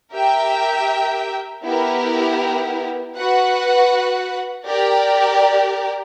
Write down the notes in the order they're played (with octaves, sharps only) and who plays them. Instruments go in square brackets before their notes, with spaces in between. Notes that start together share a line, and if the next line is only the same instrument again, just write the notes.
[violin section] G4 A#4 E5 G5
B3 E4 G4 A#4
F#4 B4 F#5
G4 A#4 D5